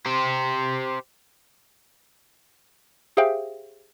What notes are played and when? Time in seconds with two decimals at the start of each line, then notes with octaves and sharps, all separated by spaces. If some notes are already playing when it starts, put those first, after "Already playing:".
0.06 G4 C5
3.17 G4 G#4 C5 E5 F5 G5